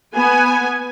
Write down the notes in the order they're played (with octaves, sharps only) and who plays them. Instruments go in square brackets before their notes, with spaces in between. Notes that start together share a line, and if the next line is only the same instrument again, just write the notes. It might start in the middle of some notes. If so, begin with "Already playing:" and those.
[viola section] B3 G#5